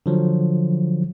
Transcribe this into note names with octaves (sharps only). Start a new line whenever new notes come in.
D3 F3 F#3